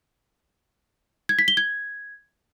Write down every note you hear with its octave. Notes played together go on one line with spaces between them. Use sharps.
G#6
B6
G7
G#6